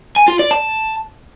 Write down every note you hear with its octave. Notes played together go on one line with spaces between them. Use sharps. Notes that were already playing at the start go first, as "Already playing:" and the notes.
G#5
F4
D5
A5